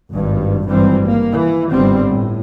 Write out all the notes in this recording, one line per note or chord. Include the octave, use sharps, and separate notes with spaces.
G#1 G2
G#1 G2 E3 G3 C4
G#1 A#3
E3
G1 G#2 G3 C4
A2